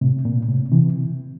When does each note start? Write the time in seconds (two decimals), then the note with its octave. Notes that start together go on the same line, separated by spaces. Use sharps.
0.01 A2 C3
0.25 A#2
0.48 A2 C3
0.72 C3 E3